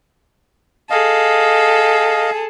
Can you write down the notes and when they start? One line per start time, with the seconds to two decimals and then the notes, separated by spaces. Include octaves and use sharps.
0.90 G#4 A4 D#5 F5